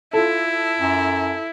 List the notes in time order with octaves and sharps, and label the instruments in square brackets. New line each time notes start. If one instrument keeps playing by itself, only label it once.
[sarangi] E4 [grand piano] F4 A4
[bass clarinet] F#2